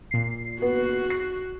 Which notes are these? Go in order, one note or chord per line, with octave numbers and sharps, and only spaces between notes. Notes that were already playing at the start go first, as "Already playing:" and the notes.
A#2 C7
B3 F#4
C7